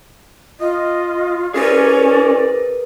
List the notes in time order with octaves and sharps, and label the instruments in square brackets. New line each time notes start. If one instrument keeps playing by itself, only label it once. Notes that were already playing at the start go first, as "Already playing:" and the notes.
[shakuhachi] F4 [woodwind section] D#5
[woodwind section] C2 D5 [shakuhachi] C#4 [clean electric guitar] G#4 A#4 B4